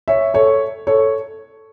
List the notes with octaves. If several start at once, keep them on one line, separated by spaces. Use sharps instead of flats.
C#5 E5
A4 C#5
A4 C#5